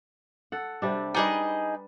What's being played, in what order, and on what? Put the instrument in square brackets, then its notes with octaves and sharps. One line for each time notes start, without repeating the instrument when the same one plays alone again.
[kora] A4 F#5
C3 G3 D4
[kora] G3 B4 D5 [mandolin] D#4 G#4 D#5